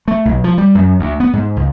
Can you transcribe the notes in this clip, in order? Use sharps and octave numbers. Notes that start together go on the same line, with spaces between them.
A3
B1
F3
G3
F#2
D2
B3
G#2
C#2